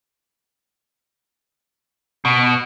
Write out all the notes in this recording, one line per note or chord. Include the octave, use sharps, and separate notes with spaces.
B2